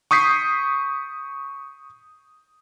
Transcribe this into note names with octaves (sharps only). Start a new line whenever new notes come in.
C#6 D#6 G6 B6 C7